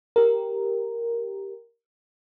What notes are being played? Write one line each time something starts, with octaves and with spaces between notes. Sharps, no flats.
G4 A#4